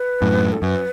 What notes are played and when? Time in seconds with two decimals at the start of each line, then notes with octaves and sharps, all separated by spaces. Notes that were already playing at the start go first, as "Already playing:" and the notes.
Already playing: B4
0.22 F#2 A2
0.52 A4
0.62 F#2 B4